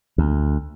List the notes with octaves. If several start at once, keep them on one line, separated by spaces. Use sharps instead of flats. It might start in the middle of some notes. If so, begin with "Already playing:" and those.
D2